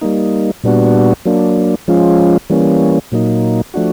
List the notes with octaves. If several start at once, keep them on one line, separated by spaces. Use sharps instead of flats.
G3 A#3 D#4
A#2 G3 B3 D4 F#4
F#3 A#3 D4
F3 G#3 C#4 F4
E3 G3 A#3 C#4
A#2 F#3 A#3 D#4
F3 A3 D4 F#4